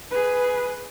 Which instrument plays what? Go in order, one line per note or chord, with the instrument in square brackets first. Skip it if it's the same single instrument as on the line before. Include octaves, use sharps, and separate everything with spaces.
[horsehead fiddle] G#4 B4